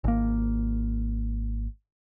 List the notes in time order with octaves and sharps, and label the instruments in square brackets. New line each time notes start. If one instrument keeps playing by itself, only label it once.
[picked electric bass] G#1 A#3